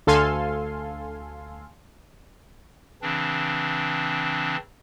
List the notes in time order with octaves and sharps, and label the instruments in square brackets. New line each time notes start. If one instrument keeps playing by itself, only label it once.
[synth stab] D2 A4 F5 G#5 C6
[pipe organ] C#3 E3 C4 D4